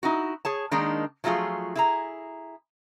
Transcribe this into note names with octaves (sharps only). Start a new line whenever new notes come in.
D#4 E4 F#4
G#4 C#5 A5
D#3 G#3 A#3 D4 D#4
F3 F#3 A3 F4 G#4
E4 G#4 A#5